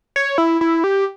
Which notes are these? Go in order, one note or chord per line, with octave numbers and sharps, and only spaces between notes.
C#5
E4
E4
G4